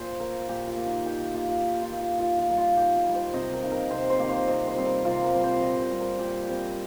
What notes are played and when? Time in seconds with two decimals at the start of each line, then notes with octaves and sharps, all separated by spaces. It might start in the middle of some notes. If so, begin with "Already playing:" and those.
Already playing: A#2 C5
0.20 A#3 A#4
0.49 A#2 G4
0.67 F4
0.77 A#3
0.86 D#4
1.06 D#3 G4
1.34 A#3 F4
1.48 F4
1.63 D#3
1.82 F4
1.91 A#3
2.01 F4
2.20 D#3 F4
2.39 F4
2.48 G3 A#3
2.58 F4
2.77 D#3 G4
2.96 G4
3.05 G3 A#3
3.15 C5
3.34 C3 D#5
3.53 A#4
3.63 D#3 A#3
3.72 A#4
3.90 C3 C5
4.10 C5
4.19 D#3 A#3
4.29 C5
4.48 C3 D#5
4.68 C5
4.76 G3 C4
4.86 A#4
5.05 C3 F4
5.24 A#4
5.33 G3 C4
5.44 C5
5.62 A#2 D#5
5.81 C5
5.90 G3 C4
6.00 A#4
6.19 A#2 G4
6.48 G3 C4